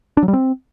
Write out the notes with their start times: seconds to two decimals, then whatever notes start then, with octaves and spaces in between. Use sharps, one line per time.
0.17 D4
0.23 F#3
0.28 G3
0.33 C4